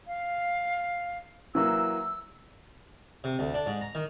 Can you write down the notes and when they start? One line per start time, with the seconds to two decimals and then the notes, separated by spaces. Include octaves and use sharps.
0.07 F5
1.55 E3 F#3 A#3 E6
3.24 C3
3.39 D2
3.54 D4
3.66 G#2
3.81 A#5
3.95 D#3